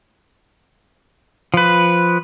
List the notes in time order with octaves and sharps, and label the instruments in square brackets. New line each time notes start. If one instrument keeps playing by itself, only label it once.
[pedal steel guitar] F3 B4